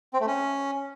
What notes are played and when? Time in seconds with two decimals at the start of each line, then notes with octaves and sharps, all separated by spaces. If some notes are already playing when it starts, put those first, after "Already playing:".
0.14 C4
0.20 A3
0.27 C#4